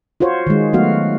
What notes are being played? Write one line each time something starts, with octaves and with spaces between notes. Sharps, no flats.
F4 F#4 C5 C#5
D#3 G#3
F#3 A3 B3 F#4 F5